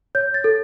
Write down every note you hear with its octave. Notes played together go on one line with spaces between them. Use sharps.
C#5 G6
A6
A4